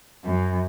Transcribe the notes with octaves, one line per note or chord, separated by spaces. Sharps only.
F#2